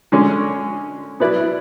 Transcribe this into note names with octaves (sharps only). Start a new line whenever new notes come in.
D3 G#3 C#4
F#3 B3 E4 B4 D5